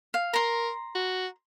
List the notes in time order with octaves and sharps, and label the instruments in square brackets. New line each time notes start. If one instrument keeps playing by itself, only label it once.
[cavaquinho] F5
[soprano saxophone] A#4 [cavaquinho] A#5 C6
[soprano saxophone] F#4